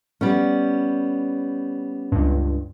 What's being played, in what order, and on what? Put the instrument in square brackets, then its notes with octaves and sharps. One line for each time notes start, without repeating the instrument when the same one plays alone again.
[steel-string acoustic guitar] G3 B3 C#4
[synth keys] C#2 G2